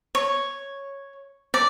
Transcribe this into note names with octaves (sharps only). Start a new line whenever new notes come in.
C#5
D5